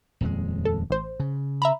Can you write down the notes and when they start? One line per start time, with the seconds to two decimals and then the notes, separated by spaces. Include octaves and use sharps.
0.21 D#1 F2 G#3
0.65 A4
0.90 A1 C5
1.20 C#3
1.62 E5 A#5 B5